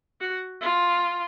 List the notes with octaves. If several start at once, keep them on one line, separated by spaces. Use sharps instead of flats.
F#4
F4